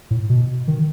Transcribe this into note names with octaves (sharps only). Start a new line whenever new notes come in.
A2
B2
D#3